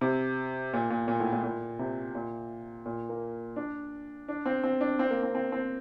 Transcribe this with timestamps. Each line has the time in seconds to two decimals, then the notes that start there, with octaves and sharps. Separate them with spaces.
0.01 C3
0.73 A#2
0.90 A#2
1.08 A#2
1.20 A2
1.33 A#2
1.44 A#2
1.79 C3
2.15 A#2
2.86 A#2
3.09 A#3
3.56 D4
4.28 D4
4.46 C4
4.64 C4
4.81 D4
4.99 C4
5.11 A#3
5.23 C4
5.35 C4
5.52 C4